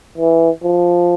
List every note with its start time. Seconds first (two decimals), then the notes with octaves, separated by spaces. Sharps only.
0.18 E3
0.63 F3